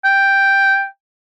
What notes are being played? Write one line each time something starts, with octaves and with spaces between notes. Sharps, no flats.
G5